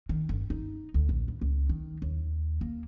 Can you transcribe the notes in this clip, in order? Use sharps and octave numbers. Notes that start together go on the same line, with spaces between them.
D#3
G1
D#4
D2
A#1
E2
C#2
D#3
D#2
A#3